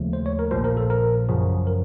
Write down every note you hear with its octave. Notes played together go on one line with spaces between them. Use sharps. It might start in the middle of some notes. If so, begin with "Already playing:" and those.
Already playing: D#2 C#3 F3 A3
C5
C#5
A#4
A#1 A#2 F3 C5
A#4
A4
A#4
F#2 C#3 F3
A#4